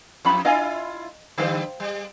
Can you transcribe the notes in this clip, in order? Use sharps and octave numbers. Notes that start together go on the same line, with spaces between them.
F2 C#4 F4 B5
D4 E4 F4 D#5 F5 G#5
D3 G3 C5 F5 G5
G3